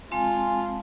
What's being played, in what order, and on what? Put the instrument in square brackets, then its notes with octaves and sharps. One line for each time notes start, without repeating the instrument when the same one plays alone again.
[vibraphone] G#3 C4 A5 [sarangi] F4 [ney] G#5